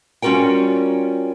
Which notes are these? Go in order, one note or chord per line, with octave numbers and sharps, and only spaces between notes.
G3 C#4 F4 F#4 A#4 G5